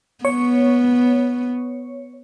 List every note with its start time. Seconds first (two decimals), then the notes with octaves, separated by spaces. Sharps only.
0.25 B3 C#5